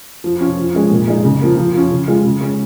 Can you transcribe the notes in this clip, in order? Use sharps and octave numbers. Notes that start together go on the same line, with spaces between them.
F3
C#4 F4
F3
G#3 C#4
A#2
G#3 D#4
C#3
F3 A#3
F3
C#4 F4
C#3
G#3 F4
C#3
G#3 C#4